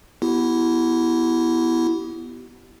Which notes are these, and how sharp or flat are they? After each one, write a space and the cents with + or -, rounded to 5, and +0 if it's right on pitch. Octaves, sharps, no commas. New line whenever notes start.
B3 +0 E4 +0 G4 -40